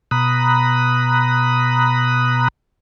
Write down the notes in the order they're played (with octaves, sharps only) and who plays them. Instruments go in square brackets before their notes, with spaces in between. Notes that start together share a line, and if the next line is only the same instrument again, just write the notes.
[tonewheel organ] B2 A#5 B5 D#6 F#6